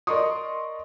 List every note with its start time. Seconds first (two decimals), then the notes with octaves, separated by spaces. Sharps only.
0.07 A#4 D5 D#5 C6 C#6 D#6